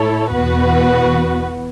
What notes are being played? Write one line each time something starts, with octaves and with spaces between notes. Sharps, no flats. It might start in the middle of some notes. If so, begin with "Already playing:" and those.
Already playing: A2 A3 E4 A4 C#5
E2 B2 B3 F#4 B4